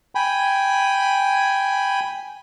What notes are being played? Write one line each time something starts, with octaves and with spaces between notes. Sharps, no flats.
G5 G#5 B5